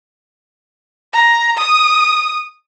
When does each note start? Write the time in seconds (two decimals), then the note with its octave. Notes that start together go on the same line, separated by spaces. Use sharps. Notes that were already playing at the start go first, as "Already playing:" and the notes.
1.13 A#5
1.57 D#6